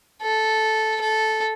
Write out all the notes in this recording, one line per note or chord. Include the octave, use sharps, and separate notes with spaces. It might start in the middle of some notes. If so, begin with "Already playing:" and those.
A4
A4